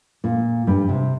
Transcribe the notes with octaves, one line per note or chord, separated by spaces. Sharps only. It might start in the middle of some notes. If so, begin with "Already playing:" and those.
A#2
G2
C3